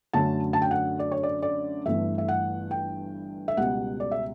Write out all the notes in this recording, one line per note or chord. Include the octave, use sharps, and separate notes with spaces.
F#2 D3 F#3 A3 C#4 A5
A5
G5
F#5
D5
C#5
D5
D5
G1 G2 E3 A3 E5
E5
F#5
G5
E5
C#2 B2 G3 F#5
D5
E5